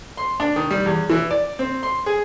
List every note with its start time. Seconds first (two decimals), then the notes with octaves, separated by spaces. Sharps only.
0.17 C6
0.40 D4
0.56 D#3
0.71 G3
0.86 E2
1.10 E3
1.31 D5
1.59 C4
1.83 C6
2.06 G#4